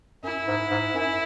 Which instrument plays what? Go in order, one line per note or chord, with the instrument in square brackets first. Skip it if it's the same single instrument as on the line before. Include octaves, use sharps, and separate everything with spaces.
[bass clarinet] F#2 [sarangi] E4
[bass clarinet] G#2
G#2
F#2